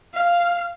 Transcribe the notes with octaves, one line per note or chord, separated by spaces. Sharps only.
F5